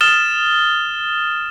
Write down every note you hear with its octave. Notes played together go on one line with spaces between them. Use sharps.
D#6 F6 A6 E7 G7